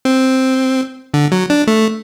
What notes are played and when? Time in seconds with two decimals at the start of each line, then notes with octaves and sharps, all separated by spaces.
0.05 C4
1.14 D3
1.32 F#3
1.50 D4
1.67 A3